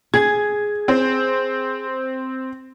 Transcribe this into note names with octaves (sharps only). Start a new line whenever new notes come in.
G#4 G#6
C4 C5